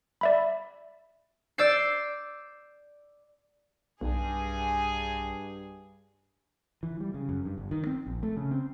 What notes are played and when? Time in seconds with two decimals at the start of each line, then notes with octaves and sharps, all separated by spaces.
0.21 D5 E5 B5
1.58 D5 E6 G6 C7
4.01 B1 G2 G#4
6.83 E3
7.00 G3
7.14 C#3
7.29 F#2
7.45 G2
7.58 G1
7.71 D#3
7.87 C4
8.07 A#1
8.23 A3
8.37 C#3
8.51 C4